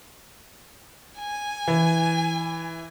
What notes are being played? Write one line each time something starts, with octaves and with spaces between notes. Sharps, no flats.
G#5
E3